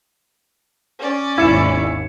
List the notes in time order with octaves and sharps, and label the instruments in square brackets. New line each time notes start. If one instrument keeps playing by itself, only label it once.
[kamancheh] C#4 D5
[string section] G#1 D#2 G#2 [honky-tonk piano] E4 [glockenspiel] G#6 C#7 E7